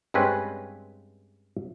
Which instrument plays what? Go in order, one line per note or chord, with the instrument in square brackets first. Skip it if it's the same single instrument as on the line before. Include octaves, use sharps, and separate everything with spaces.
[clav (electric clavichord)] G2 G#3 C4 C#4 B4